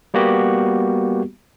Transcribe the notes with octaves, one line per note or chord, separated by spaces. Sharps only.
G3 A#3 B3 F#4 G4